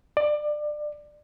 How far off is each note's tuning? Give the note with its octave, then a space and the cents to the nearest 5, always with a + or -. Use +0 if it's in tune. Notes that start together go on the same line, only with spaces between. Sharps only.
D5 +25